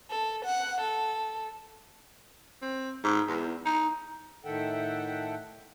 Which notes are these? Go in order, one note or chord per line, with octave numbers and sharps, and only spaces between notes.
A4
F#5
A4
C4
G#2
E2
D#4
A2 D#3 A4 E5 F#5 G5